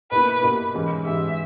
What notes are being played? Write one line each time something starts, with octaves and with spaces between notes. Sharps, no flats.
B2 A#3 E4 B4
B2 A#3 E4
G#2 E3 G#3 C#4
G#2 E3 G#3 C#4 E5